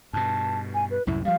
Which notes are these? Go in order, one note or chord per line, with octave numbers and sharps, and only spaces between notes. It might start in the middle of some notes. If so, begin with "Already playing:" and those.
G2 B2 A5
G#5
B4
C2 F#2 A2 E4
F3 G3 F5